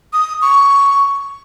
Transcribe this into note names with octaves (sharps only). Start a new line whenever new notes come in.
D#6
C#6